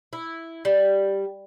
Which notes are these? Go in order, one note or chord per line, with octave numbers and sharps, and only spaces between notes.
E4
G3